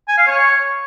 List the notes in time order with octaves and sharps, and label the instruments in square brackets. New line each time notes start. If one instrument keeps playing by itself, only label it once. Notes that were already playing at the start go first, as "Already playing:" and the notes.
[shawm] G#5
F5
C#5